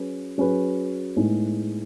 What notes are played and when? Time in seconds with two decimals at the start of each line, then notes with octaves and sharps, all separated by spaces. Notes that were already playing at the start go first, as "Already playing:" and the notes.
Already playing: F#3 C#4 G#4 B4
0.38 F#3 C#4 G#4 B4
1.16 A2 G#3 B3 D#4 G#4